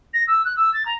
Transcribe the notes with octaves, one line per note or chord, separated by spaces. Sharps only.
A#6
E6
F#6
E6
A6
A#5